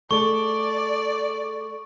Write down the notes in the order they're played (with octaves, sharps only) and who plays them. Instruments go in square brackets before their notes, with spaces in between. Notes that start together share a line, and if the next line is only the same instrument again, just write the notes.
[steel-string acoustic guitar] A3 G#4 A4 [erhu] D5 [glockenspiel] C#6